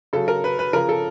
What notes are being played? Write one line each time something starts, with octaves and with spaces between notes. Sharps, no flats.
C#3 F#3 A4
A#4
B4
B4
C#3 F3 A#4
A4